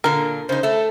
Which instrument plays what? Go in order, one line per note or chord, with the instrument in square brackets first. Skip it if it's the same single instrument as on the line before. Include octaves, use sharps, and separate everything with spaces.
[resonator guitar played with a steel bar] A#2 D3 [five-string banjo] A#4
[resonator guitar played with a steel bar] C#3 D#4 [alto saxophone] C5
[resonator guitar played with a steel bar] A3 A4 [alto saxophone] E5